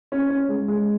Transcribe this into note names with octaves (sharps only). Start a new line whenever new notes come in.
C#4
C#4
G#3
G#3